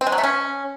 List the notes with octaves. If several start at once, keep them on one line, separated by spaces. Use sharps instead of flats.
C4
G#3
F#3
A3
C#4